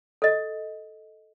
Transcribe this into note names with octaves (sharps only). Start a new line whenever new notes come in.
A4 D#5